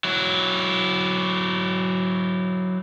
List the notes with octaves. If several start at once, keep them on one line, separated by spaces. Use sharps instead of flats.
F#3 E4